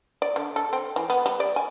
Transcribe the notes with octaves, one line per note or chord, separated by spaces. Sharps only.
D5
D3
A4
C4
E3
B3
G3
D5
G#5